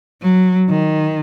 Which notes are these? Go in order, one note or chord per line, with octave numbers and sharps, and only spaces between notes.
F#3
D#3